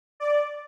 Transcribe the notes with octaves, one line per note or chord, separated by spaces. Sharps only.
D5